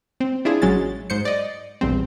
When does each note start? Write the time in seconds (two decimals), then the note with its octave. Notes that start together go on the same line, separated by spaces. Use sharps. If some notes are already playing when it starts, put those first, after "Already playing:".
0.20 C4
0.45 D4 E4 F4 G#4
0.62 A1 F#3 G#3 C#4 A6
1.10 G#2 C5 G6 C#7
1.25 D5 D#5
1.81 A#1 E2 G2 C4